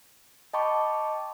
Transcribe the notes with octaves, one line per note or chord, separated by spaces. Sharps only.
D#5 G5 A5 B5 C#6 D6